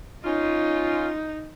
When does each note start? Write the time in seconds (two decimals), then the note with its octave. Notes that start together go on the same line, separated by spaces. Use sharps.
0.25 C#4 D#4 F4